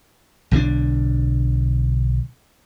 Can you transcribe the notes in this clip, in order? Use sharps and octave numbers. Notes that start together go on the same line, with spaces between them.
B1 D3 F3 D4